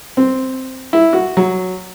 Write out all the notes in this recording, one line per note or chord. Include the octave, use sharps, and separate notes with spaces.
C4
E4
F#4
F#3